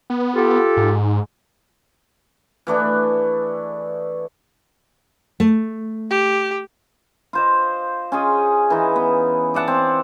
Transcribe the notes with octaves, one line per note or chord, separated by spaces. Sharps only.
B3
F4 G4 A4
G#2
E3 A3 D4 G#4
A3
G4
F4 C5 D#5
C#4 F4 G#4 D#5
E3 D#4
B3
D5 E5 F#5 A5
C4